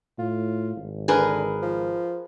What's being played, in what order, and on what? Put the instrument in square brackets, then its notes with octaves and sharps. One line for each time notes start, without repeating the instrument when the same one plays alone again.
[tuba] A2 [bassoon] F4
[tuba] G#1
[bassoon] D3 [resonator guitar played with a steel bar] G#4 A#4 B4
[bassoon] F3